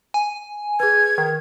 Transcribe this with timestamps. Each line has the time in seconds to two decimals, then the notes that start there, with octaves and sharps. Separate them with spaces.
0.14 G#5
0.80 G#4 B4 G#6
1.18 D#3